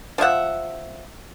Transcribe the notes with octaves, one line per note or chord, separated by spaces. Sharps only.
F3 F4 E5 F#5